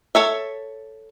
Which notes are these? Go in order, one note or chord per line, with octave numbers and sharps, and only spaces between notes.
A4 C#5 E5